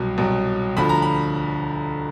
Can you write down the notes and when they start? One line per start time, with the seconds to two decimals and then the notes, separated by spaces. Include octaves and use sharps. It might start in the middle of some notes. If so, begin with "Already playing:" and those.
Already playing: C2 B2 F#3
0.18 C2 B2 F#3
0.76 D2 D3 F3 B5
0.89 A#5
1.02 B5